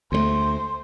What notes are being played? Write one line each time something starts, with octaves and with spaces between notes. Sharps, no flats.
D2 F#3 A3 C5